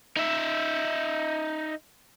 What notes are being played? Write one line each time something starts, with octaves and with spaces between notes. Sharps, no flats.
D#4 E5